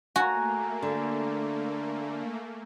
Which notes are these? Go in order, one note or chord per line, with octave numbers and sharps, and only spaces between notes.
A3 A#3 F#4 G#5 A#5
D3